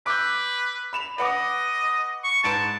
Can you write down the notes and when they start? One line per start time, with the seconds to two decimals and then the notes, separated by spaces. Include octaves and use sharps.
0.06 B4 D6 E6 G6
0.93 B5 E7 F7
1.18 B4 D#5 F#5 D6
2.24 C#6
2.44 G#2 B4 A5 D7